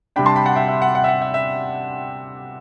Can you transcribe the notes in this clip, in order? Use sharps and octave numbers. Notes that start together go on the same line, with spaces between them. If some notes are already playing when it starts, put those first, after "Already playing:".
C3 G3 D4 G5 B5
A5 C6
G5 B5
F#5 A5
E5 G5
E5
F#5
F#5
E5
F#5
E5
E5